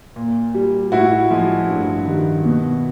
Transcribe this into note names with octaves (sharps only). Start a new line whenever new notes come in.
A#2
G3
A2 E4 F#4
F3 G#3
G2
D#3 G3
B2